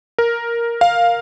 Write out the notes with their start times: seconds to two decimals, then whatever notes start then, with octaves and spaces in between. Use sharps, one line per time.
0.18 A#4
0.81 F5